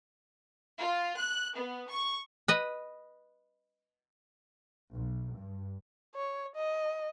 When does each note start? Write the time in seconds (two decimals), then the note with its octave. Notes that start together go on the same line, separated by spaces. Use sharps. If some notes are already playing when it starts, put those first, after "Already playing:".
0.79 F4
1.16 F#6
1.56 B3
1.89 C#6
2.48 B4 D#5
4.94 B1
5.38 G2
6.15 C#5
6.56 D#5